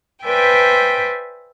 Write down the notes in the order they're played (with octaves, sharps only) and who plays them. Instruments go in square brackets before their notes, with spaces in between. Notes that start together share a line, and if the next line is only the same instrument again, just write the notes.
[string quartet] B4 C5 D5 E5 G5 G#5